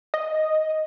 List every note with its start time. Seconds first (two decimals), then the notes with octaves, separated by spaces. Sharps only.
0.14 D#5